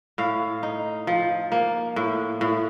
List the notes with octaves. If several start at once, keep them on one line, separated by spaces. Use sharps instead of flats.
A2 F5
D#4
F3
A#3
A2
A2